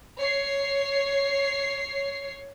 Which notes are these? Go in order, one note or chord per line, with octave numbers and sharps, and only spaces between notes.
C#5 C7